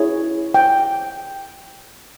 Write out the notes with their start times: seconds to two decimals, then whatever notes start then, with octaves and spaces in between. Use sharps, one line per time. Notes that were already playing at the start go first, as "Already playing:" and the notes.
Already playing: E4 G#4 C#5
0.54 G5